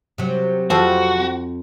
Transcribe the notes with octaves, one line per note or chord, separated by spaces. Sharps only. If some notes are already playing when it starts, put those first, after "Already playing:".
C3 F#3
F2 F3 C4 F#4